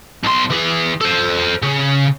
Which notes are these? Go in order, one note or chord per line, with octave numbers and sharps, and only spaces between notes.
B1 C6
E3 G#4
A4 C5
C#3